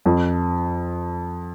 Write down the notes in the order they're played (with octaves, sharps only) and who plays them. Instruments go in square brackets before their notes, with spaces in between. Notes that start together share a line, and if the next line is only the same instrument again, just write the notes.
[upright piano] F2